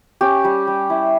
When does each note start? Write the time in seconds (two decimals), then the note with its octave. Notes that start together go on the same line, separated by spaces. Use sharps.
0.21 C#4 G4
0.44 G3
0.67 G3
0.90 E4